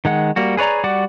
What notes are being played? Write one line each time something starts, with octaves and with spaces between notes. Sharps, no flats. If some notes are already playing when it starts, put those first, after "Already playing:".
D#3 G#3 F#5
G3 A#3 F#4
G#4 B4 C#5 D5 A#5
G3 F#4 D5 F#5 D6